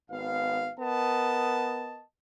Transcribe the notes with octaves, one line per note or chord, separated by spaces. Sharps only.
G#1 B3 F5
B3 A#4 D#5 A5